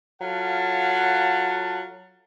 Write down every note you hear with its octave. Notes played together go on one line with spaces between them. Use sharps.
F#3 F4 A4 F5 F#5 A5